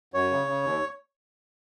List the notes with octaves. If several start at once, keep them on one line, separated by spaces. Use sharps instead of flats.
F#2 C#5
C#3
C#3
D#2